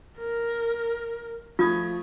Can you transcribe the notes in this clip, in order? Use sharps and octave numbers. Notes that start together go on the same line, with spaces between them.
A#4
F3 A3 F4 D#6 G#6